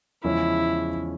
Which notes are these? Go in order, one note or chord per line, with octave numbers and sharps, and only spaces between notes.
E2 C#3 F3 G#3 C#4 E4